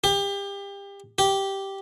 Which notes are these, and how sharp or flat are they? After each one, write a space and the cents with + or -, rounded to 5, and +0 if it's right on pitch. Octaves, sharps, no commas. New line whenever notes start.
G4 +30
G4 -5